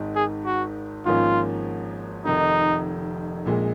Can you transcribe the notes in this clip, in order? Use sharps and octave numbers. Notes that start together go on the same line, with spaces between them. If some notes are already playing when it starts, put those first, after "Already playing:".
Already playing: G#1 G#2 D#3
G#4
F#4
G#1 G#2 F3 A#3 C#4 F4
F1 F2 D#3 D#4
A#1 A#2 G#3